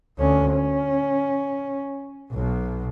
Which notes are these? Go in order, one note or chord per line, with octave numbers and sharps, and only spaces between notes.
D2 C#4
C#4
B1 B2